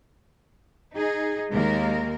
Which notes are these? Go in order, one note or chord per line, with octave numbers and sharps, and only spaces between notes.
D#4 G#4
D#2 G#3 A#3 A#4